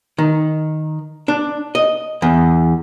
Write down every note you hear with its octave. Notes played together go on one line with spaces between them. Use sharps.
D#3
D4
D#5
E2